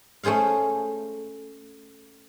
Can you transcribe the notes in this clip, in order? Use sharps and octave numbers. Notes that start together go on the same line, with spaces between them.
A3 C#4 G#4 C5 F5